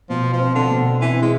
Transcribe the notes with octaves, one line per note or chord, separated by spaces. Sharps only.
B2 F3
F3
C4
D3
B2
E3 C4
G#3